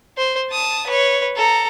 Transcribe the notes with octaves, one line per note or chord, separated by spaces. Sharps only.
C5
A5 D#6
B4 C#5
A4 A#5